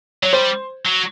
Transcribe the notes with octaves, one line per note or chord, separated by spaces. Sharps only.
F#3 C#5
G3 C5
F#3